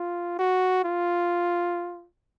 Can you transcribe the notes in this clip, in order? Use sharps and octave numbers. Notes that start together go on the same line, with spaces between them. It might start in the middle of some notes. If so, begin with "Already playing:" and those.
Already playing: F4
F#4
F4